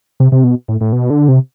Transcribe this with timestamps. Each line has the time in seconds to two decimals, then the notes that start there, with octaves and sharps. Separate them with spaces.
0.20 C3
0.32 C3
0.44 B2
0.68 A2
0.81 A2
0.92 B2
1.10 D3
1.28 C3